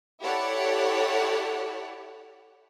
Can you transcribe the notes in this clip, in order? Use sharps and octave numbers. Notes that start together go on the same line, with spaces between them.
E4 G4 A4 C#5 D5 F#5